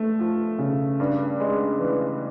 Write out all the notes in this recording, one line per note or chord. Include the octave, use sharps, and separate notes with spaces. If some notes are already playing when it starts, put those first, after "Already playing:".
Already playing: A3
F3
C#3
G2
G#3
E3